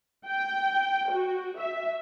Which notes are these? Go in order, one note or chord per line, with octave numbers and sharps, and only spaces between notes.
G5
F#4
E5